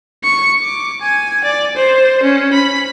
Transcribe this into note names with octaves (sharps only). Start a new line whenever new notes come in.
C#6
D6
G#5
D5
C5
C#4
B5